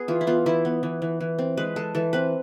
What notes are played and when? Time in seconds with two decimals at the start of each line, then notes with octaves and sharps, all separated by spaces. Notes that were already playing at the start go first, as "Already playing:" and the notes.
Already playing: B3 G#4
0.08 E3 F4
0.21 E4
0.27 B3 F4
0.46 E3 E4
0.65 B3
0.83 E3
1.02 E3
1.20 E3
1.39 C4
1.57 G#3 B4
1.76 G#3 A4
1.95 E3 A4
2.13 C4 B4